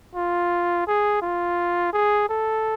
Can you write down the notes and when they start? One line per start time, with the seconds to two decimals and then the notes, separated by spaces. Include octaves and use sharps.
0.15 F4
0.87 G#4
1.22 F4
1.93 G#4
2.29 A4